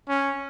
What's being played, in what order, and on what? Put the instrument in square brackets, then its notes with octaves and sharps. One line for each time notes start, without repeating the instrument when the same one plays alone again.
[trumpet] C#4